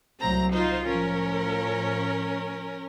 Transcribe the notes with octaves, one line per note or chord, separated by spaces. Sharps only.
C2 F#3 A3 C4 A#5
D#4 F4 C5
A2 F3 C#4 A#4